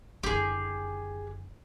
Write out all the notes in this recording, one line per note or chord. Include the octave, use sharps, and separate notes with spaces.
F#1 D3 G4 G#4